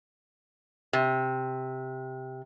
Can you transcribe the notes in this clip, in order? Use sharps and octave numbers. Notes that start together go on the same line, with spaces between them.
C3